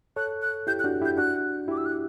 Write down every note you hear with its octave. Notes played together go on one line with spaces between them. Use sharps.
A4 C#5 F#6
F#6
E4 G4 G6
F#6
D4 F#4
E4 G4 G6
D4 F#4 F#6
E4 G4 D6
E6
F#6